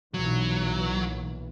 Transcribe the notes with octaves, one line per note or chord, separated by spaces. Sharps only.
B1 A#2 E3 F#3